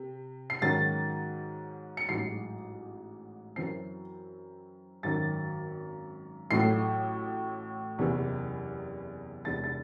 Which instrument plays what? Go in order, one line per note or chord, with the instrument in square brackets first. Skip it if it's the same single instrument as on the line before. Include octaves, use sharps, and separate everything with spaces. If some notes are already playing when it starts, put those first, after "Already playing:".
Already playing: [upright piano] C3
C7
G#2 D#3 F#3 C#4 A6
C#7
A1 G#2 F#3 C7
F#2 E3 C4 C7
G#1 F#2 D#3 A6
A1 A2 F#3 A3 C7
F#1 E2 C3 E3
E1 E2 C3 A6
A6